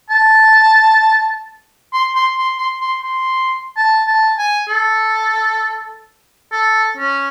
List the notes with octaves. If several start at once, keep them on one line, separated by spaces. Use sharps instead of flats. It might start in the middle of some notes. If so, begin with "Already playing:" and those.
A5
C6
C6
C6
C6
C6
C6
A5
A5
G#5
A4
A4
C#4